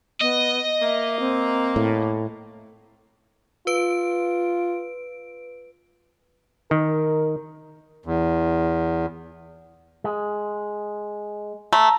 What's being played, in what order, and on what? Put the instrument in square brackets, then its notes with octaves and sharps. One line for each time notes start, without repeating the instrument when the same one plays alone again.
[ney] B3 [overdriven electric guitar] D#5
[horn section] A#3 [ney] E5
[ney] C4
[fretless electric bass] A2
[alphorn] F4 [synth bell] B4 D7
[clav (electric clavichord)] D#3 [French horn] A#4
[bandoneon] E2
[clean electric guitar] G#3
[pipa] A3 [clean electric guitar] A#5